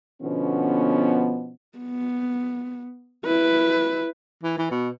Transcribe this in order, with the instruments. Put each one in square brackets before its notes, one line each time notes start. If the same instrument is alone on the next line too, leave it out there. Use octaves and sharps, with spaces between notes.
[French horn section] B2 D3 F3 B3 C#4
[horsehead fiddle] B3
E4 B4
[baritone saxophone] E3
E3
B2